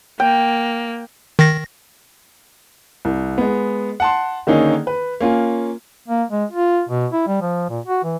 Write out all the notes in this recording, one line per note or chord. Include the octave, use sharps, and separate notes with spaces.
A#3 G5
D#3 A#6
C2
G#3 B3
F#5 A5 C6
D3 D#3 A#3 C#4 D#4 G#4
B4
A#3 C#4 F4 G#5
A#3
G#3
F4
B2
E4
G3
F3
A#2
F#4
E3